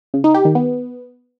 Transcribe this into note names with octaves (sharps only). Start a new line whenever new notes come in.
C#3
D#4
G4
D#3
B3